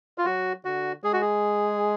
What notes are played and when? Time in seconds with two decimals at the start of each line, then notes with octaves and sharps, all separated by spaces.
0.18 F4
0.25 F#3 F#4
0.65 D3 F#4
1.04 G#3 G#4
1.13 F#4
1.21 G#4